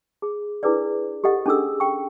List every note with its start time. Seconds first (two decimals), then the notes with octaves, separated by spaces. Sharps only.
0.22 G#4
0.63 D4 E4 G#4 A#4 B4 D5
1.24 G4 A4 D#5 F#5
1.46 C#4 D4 G#4 A4 E6
1.80 G5 C#6